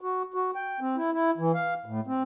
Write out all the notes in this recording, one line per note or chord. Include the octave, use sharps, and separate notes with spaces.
F#4
F#4
G5
C4
E4
E4
E3
F5
A2
C4